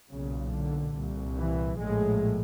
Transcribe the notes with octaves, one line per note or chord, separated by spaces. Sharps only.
B1 A#2 C#3
D3
C2 A#2
E3
A#1 A2 G#3